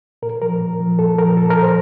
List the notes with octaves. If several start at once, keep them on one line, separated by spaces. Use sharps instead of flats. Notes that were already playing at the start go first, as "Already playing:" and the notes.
A#2 A#4
F3 A#4
A#2
F3
A#2 A4
F3 A#4
A#2 A4
A#4
F3
C5